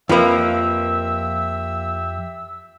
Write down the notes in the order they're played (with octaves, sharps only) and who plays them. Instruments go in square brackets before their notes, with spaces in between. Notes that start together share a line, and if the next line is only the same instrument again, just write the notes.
[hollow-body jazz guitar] F2 B4 [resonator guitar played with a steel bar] F3 A#3 [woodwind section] G4 E5 E6